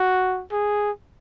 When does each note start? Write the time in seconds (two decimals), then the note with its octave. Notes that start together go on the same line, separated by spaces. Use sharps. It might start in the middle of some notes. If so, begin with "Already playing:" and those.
Already playing: F#4
0.51 G#4